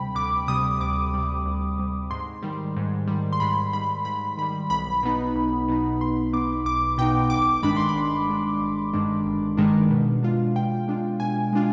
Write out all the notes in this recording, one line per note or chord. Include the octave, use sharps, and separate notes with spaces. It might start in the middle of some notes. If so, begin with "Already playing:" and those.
Already playing: D2 C3 G3 G5 B5
D2 D6
C3 G3 D#6
D2 D6
C3 G3
D2
C3 G3
G#2 C6
D#3 G3
G#2
D#3 G3
C6
G#2 B5
D#3 G3 B5
G#2 B5
D#3 G3 B5
B1 B5
B2 B3 D#4
B1
B2 B3 D#4
B1 C6
B2 B3 D#4 D6
B1 D6
B2 B3 D#4 G5
G1 D6
G2 D#3 G#3 D4 B5
C6
B5
G1
G2 D#3 G#3 D4
G1
G2 D#3 G#3 D4
G1
G2 D#3 G#3 D4
B2
G#3 D4 F4
B2 G5
G#3 D4 F4
B2 G#5
G#3 D4 F4